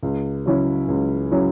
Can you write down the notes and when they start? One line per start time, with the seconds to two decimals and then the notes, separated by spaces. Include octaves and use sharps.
0.03 C#2
0.46 C#3 F#3 C#4 E4
0.88 C#2
1.31 C#3 F#3 C#4 E4